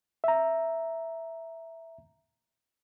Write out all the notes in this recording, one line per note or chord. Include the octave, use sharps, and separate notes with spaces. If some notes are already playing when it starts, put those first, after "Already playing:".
E5 A#5